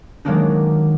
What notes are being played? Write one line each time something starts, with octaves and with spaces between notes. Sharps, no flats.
D#3 F#3 G#3 A#3 D4 D#4